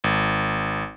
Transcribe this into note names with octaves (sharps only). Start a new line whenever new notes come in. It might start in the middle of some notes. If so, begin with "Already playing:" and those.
G#1